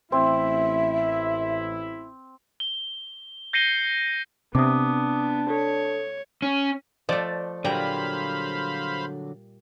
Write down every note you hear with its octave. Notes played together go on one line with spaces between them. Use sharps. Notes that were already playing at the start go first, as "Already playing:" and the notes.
A1 C4 E4 E5
G7
G6 A#6 C7 C#7 D#7 G7
C3 B3 D4 D6 D#6
A4 C#5
C#4
F3 A3 D5
A#2 D3 F#3 G3 C5 F5 A#5 B5